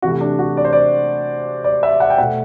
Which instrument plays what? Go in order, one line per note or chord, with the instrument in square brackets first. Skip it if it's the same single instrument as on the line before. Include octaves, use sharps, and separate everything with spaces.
[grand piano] C3 E3 A3 F#4
D4
F#4
D5
C5
D5
D5
E5
F#5
G5
B2 A3 F#5